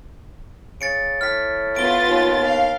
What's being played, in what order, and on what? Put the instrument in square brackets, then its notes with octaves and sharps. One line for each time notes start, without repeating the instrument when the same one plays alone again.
[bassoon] C#3 [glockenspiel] A6 C#7 D7
[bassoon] A2 [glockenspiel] F6 B6
[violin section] B3 F4 A6 [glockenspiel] D7 G7
[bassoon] D#2
[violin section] F5